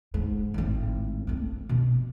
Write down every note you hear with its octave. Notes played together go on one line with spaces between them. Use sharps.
G#2
G#1 A2
A3 C4
B2